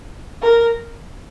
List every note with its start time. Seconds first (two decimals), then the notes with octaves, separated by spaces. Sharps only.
0.42 A#4